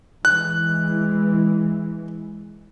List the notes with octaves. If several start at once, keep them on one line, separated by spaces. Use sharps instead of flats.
E3 G#3 F#6